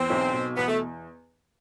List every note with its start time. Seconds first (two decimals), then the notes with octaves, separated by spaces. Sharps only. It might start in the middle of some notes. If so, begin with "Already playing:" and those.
Already playing: E2 C4
0.10 B1
0.33 B2
0.57 E2 B3
0.68 A3